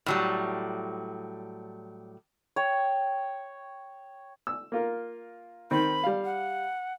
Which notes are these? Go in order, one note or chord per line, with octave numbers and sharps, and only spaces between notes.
A2 F#3 G3
C#5 G5
E6
A#3 F4 A#4
D#3 C4 B5
G3 F5
F#5